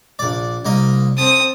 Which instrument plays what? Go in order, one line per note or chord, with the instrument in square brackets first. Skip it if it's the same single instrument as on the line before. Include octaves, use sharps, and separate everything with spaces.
[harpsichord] A#1 D5
C2 A#3 D#5
[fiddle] C4 D#6 [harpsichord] A5